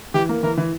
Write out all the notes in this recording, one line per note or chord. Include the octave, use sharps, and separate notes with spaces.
E3 G4
A#3
E3 A#4
E3